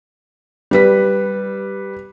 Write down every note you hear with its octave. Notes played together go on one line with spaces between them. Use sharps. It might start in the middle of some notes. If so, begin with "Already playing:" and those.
G3 B4 B6